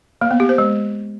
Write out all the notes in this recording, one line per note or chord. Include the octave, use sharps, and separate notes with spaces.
A#3
B3
G4
C5
G#3